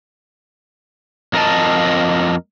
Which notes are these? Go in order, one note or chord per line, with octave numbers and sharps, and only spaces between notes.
F2 A#4 D#5 A5